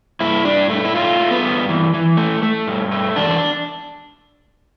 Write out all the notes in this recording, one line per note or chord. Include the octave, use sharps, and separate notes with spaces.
G2 E4
G2 D4
A3
E4
A3 F4
A3
B3
G2
E3
E3
A3
A3
G2
A3
E2 D4